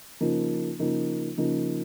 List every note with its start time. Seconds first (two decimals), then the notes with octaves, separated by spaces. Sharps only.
0.20 C#3 F3 A#3 D#4
0.79 C#3 F3 A#3 D#4
1.38 C#3 F3 A#3 D#4